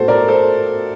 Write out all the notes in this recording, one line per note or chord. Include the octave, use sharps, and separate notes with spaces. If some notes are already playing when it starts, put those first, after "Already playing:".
Already playing: A2 F#4 A4 C5
A#4 D5
A4 C5